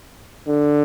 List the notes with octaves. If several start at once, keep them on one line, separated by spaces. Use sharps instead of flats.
D3